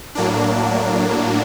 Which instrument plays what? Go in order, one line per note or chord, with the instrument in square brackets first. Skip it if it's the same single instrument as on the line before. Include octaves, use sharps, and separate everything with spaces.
[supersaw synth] A2 F#3 A#3 D4